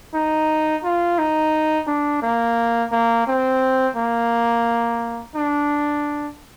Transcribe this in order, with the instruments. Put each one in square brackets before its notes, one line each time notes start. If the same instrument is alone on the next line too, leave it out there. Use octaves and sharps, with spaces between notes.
[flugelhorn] D#4
F4
D#4
D4
A#3
A#3
C4
A#3
D4